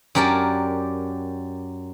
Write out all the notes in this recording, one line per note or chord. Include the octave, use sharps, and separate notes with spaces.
F#2 G4 A#4 D5 A5